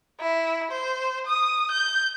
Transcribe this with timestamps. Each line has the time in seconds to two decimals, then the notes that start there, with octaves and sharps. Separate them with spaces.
0.20 E4
0.71 C5
1.27 D#6
1.71 G6